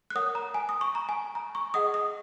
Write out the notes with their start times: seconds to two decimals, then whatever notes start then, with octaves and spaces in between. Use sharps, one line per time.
0.10 F#6
0.15 A#4 C#5 F#5 D#6
0.35 A#5
0.54 G#5
0.69 D#6
0.81 C#6
0.95 A#5
1.09 G#5
1.35 A#5
1.55 C#6
1.74 G#4 D#5 F#5 D#6
1.94 D#6